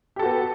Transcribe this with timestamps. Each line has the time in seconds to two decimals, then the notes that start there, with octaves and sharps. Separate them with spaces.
0.16 G4
0.19 A4
0.22 F#4
0.25 B3